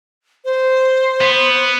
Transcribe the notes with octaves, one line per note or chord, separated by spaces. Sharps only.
C5
B3